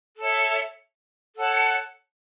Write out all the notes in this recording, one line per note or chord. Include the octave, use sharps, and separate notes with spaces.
A4 C#5 E5
A4 C#5 F#5 A5